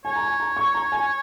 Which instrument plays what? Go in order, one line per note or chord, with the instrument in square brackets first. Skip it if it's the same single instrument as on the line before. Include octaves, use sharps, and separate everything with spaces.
[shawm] C#5 [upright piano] G#5
[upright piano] A#5
G#5
A#5
C#6
A#5
G#5